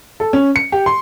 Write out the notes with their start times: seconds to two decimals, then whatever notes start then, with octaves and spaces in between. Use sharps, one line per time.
0.20 A4
0.33 C#4
0.56 C#7
0.72 G4
0.86 C6